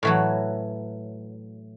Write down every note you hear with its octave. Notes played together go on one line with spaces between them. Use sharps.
A2 E3 F#3